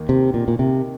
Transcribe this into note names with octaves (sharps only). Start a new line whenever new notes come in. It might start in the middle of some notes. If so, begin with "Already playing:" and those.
Already playing: D#2 D#3 A#3
C3
A#2
A#2
C3